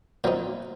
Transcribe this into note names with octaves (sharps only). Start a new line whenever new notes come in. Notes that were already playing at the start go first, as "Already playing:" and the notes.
A#2 F#3 C4 D#4 G5